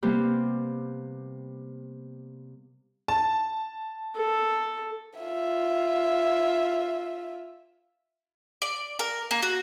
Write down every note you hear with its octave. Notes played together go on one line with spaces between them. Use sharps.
C3 G3 A#3 B3 G4
A5
A4
F4 E5
D5
A#4
A#3
F#4